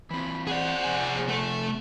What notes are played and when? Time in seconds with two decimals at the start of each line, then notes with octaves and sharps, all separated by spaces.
0.11 E3 C4 B5
0.47 G#4 C5 D5 F#5
0.84 C3 F3 G#5
1.28 A3 A4